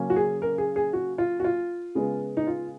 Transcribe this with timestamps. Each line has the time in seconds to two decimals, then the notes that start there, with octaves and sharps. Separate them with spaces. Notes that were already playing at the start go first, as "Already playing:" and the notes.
Already playing: C#3 F#3 A#3 C#4
0.10 F#4
0.16 G#4
0.42 A#4
0.58 G#4
0.76 G#4
0.93 F#4
1.18 F4
1.40 F#4
1.44 F4
1.95 C#3 G#3 B3
2.37 D#4
2.47 F4